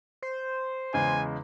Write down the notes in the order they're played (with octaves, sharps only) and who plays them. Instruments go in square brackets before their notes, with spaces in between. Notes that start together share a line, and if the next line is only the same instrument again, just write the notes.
[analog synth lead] C5
[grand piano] E2 C#3 G#3 [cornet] G#5